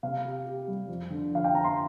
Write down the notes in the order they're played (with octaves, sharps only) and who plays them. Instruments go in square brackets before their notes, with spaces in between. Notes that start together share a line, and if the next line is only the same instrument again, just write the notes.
[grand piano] C3 [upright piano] F5
[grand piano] G4
G4
G3
F2
D3
[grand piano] F2 [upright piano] F5
[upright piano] G5
[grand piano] F2 [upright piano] A#5
[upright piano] C6